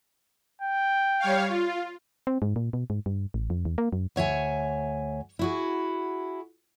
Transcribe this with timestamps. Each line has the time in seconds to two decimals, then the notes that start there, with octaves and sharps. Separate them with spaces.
0.62 G5
1.20 G3 C#5 F5
1.48 F4
2.27 C4
2.42 G#2
2.56 A#2
2.73 B2
2.90 G#2
3.06 G2
3.34 A1
3.50 F2
3.65 E2
3.78 A#3
3.93 F#2
4.16 D2 C#5 E5 G#5
5.39 E4 F#4 G#4